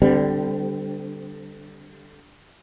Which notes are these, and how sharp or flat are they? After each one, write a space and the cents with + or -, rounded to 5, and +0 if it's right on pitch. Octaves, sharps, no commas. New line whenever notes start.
D3 +0 G3 +0 C4 -30